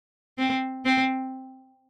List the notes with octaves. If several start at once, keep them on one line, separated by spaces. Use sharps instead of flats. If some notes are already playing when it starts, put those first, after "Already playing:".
C4
C4